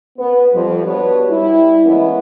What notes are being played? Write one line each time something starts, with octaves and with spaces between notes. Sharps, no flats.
B3
F2 F3 G3
B3 D4 F#4 G4 B4 C#5
G3 E4
E2 G#3 A#3 B3 C#4 E4